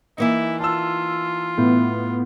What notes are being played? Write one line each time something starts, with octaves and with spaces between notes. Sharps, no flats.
E3 A#3 D#4 E4
F4 A5 E6
A2 B3